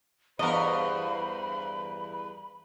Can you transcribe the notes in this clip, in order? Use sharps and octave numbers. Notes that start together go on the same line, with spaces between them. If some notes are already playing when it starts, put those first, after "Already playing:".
E2 G2 B3 A#4 C5 D#5 B5